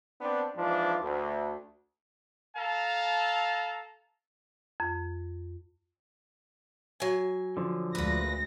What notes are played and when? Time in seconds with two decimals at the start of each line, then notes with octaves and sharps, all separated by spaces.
0.21 B3 C4 D4
0.56 G#2 E3 F3 D4 F4
1.01 D2
2.56 A4 F5 A5 A#5
4.80 F2
7.00 F#3 G#5
7.57 D3 F3
7.95 D2 A#2 G#3 B4 A#6